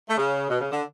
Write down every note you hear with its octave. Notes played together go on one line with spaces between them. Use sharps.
A3
C#3
B2
C#3
D3